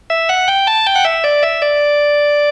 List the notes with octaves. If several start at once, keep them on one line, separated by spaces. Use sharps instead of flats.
E5
F#5
G5
A5
G5
F#5
E5
D5
E5
D5